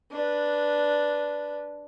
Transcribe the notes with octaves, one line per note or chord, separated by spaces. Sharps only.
D4 B4